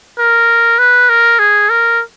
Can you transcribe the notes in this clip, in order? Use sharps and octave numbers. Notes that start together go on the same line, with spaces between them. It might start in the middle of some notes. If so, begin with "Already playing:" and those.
A#4
B4
A#4
G#4
A#4